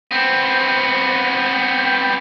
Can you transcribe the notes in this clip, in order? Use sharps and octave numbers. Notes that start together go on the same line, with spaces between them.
B3 C4